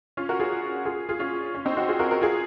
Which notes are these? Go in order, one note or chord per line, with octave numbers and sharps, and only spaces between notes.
C#4 F4
F#4 A#4
F4 G#4
F4 G#4
F4 G#4
C#4 F4
C#4
C4 D#4
D#4 F#4
F4 G#4
F#4 A#4
F#4 A#4
F4 G#4